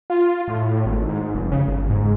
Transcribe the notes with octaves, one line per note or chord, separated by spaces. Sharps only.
F4
A2
G#1
G#2
F1
C#3
G1
G#2